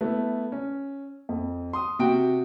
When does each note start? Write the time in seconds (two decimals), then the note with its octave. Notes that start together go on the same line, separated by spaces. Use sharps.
0.01 A3 B3 E4
0.52 C#4
1.29 F2
1.73 C6 D#6
1.99 C3 F#4 G4 G5 D7